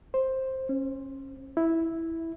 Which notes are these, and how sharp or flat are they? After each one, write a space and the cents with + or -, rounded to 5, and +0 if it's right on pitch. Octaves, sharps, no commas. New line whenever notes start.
C5 +10
C#4 -30
E4 -5